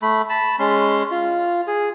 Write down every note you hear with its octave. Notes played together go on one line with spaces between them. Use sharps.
A3 B5
A5 B5
G#3 C#4 C6
F4
G#4